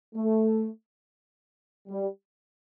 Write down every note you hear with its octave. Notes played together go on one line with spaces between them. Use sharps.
A3
G3